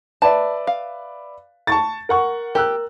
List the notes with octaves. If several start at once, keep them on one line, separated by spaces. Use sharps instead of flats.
B4 D5 E5 A5
F5
A5 C#6 A6
A#4 F#5 C#6
G4 A#4 E6 F#6